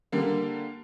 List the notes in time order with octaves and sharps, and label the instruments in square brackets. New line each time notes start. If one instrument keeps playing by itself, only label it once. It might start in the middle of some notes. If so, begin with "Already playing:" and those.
[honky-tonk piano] D3 G3 A#3